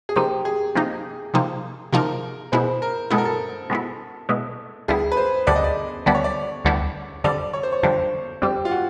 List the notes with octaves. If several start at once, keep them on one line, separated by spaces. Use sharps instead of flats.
G#4
C3 F3 A#3 D#4 G4
G#4
C3 F3 A#3 D#4
C3 F3 A#3 D#4
C3 F3 A#3 D#4 A#4
B2 G#3 B3 E4 C5
A#4
B2 G#3 B3 E4 A4
A#4
A4
B2 G#3 B3 E4
B2 G#3 B3 E4
D2 D3 G3 B3 E4 G#4
B4
C5
D2 D3 G3 B3 E4 D5
D#5
D5
D2 D3 G3 B3 E4 D5
C#5
D5
D2 D3 G3 B3 E4
F2 D3 G3 D5
C#5
C5
C#5
F2 D3 G3 C5
F2 D3 G3 G4
F4
F#4